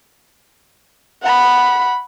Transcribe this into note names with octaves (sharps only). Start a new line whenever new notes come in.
F#5 B5